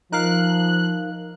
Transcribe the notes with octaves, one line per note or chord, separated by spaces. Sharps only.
F3 D#4 A#4 F5 F#6